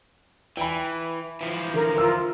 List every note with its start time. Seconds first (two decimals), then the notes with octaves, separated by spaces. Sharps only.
0.57 E3 G5 G#5 B5
1.41 E3 F3
1.74 D3 A#4
1.98 F4 E6